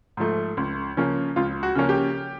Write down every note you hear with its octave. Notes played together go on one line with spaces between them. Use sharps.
G#2 F3 A3
C#2
C#3 F3 A#3 C#4
C#2 F4
F#4
C#3 F3 A#3 C#4
G4